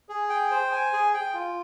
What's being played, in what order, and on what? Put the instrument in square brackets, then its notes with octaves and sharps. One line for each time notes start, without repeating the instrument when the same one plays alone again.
[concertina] G#4
G5
C5
G#5
G#4
G5
F4